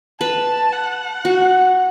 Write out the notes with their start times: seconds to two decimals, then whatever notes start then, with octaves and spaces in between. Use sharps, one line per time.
0.21 B4 A5
0.73 F#5
1.25 F#4